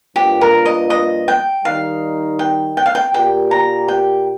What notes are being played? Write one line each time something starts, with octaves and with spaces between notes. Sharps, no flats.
G2 F3 A#3 G4
A#4
D#5
D#5
G5
D#3 G3 D#4 F5
G5
G5
F5
G5
A#2 A#3 G4 A#4 G5
A#5
G5